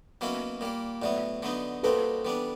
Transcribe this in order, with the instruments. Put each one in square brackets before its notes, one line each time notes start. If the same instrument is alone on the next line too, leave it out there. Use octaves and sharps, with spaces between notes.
[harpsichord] B2 F#3 A#3 C#4 E4
A#2 G3 A#3
[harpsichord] A2 F#3 B3 [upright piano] D5 E5
[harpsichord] D3 F#3 B3 D#4
[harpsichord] A#2 G3 C4 D#4 F#4 [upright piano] A4 B4
[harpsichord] E3 G3 B3 D4